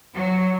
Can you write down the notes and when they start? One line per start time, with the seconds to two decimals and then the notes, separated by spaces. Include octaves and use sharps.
0.14 F#3